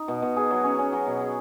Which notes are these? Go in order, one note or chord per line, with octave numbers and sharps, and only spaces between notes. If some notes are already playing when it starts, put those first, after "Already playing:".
Already playing: D#4
B2
B2
G#4
F#3
C#4
C#4
F#3
B2
G#4